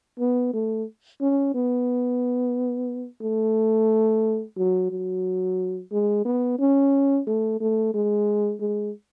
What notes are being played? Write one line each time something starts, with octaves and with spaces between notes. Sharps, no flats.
B3
A3
C#4
B3
A3
F#3
F#3
G#3
B3
C#4
A3
A3
G#3
G#3